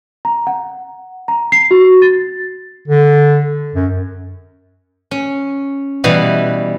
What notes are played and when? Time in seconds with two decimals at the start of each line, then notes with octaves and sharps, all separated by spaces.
0.25 A#5
0.47 F#5
1.28 A#5
1.52 C7
1.71 F#4
2.02 A6
2.88 D3
3.75 F#2
5.11 C#4
6.04 B2 E3 G3 F#5